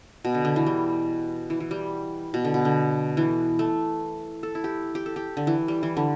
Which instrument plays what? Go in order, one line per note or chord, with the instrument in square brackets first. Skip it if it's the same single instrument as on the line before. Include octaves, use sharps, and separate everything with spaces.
[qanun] B2
D3
D3
E3
G3
E3
E3
G3
B2
D3
B2
D3
E3
A3
A4
E4
G4
G4
A4
G4
D3
E3
G3
E3
D3